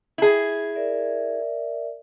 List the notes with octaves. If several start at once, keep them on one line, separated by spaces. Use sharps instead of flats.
E4 G#4
A#4 D5 E5